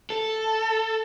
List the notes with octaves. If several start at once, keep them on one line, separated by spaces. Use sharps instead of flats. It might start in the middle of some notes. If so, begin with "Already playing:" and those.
A4